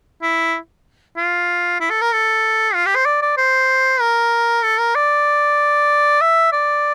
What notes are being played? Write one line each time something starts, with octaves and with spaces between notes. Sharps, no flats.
E4
F4
E4
A4
A#4
A4
F4
G4
C5
D5
D5
C5
A#4
A4
A#4
D5
E5
D5